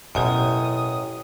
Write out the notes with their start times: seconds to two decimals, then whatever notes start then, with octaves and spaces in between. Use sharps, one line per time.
0.15 A1 F#2 B2 E4 F4 C#5 G5 D#6